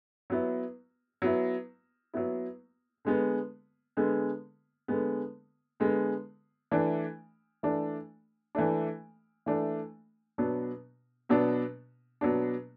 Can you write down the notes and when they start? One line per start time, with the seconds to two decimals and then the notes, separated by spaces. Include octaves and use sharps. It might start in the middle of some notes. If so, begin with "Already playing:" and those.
0.30 F#3 B3 E4
1.22 F#3 B3 E4
2.14 F#3 B3 E4
3.05 D3 G#3 B3
3.97 D3 G#3 B3
4.88 D3 G#3 B3
5.80 D3 G#3 B3
6.71 E3 A3 D4
7.63 E3 A3 D4
8.55 E3 A3 D4
9.46 E3 A3 D4
10.38 B2 F#3 B3 D4
11.29 B2 F#3 B3 D4
12.21 B2 F#3 B3 D4